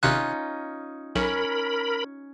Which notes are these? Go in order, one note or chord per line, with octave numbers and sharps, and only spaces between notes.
G#1 C3 C#4 D#4 F4 F#6
B1 C#4 A#4 B5